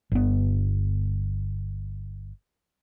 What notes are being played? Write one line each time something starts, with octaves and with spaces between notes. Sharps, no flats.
G1 B3